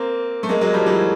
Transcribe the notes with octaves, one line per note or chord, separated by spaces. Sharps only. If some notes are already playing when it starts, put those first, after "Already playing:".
Already playing: A#3 C4
A3
G#3 A#3
F#3 G#3
F3 G3
E3 F#3